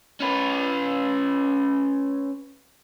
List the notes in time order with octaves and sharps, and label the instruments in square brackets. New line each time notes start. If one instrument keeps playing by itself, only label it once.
[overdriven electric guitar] C#4 B4